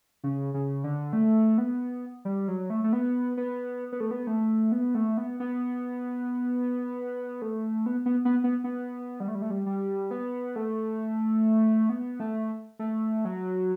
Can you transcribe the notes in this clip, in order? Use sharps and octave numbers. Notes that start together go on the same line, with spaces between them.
C#3
C#3
D3
A3
B3
G3
F#3
A3
A3
B3
B3
B3
A3
B3
A3
B3
A3
B3
B3
A3
B3
B3
B3
B3
B3
G3
A3
G3
A3
G3
G3
B3
A3
B3
A3
A3
F#3